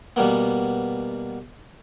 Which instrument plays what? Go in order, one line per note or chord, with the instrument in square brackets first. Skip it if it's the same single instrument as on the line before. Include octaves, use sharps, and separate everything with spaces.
[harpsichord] B2 G3 A#3 B3